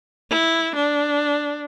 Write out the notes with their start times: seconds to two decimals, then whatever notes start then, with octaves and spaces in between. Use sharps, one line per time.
0.30 E4
0.75 D4